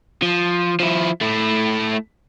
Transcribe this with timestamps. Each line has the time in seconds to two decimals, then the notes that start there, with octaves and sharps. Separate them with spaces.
0.22 F3
0.80 F3 E4
1.21 A3 E4